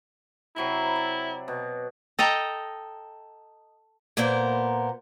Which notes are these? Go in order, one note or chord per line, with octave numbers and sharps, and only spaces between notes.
C3 F#3 E4 B5
D5
B2
A4 D#5 G5 A#5
A#2 A#3 B3 A#4 C5